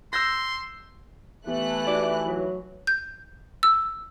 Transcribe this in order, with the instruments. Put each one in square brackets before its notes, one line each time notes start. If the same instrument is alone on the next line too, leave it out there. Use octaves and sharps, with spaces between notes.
[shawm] C6 [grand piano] E6 G6 A#6
[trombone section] E3 [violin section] A3 F#6 [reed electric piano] B3 G4
[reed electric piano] D#4 F#4 G4 [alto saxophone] D5
[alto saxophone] F#3
[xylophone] G6
E6